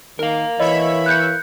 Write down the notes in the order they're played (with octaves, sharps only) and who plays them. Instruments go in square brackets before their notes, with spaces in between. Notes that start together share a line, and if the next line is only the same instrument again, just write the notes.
[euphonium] D#3 [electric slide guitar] A#4 F5
[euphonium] E3 [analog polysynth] C#5 E5 B5 [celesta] D#5
[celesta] F#6 G6 C#7